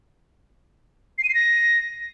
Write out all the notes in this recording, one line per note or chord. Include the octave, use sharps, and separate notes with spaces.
C7
D#7
C7
A#6